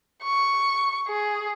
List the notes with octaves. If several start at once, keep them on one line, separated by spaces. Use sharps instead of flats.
C#6
G#4